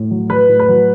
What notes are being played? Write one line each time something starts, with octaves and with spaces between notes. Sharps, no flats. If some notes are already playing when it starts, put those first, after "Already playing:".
Already playing: A2
F#3
F#3 B4
A2
B4
F#3